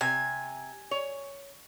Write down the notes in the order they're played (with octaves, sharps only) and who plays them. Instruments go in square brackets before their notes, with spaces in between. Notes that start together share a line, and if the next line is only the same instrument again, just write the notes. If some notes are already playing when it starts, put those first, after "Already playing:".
[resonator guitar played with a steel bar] C3 [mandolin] G#5
[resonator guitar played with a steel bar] C#5